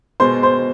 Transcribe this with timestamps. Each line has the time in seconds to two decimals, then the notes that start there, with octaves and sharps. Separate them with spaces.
0.20 B2 G#3 B3 C5 C6
0.43 C5 C6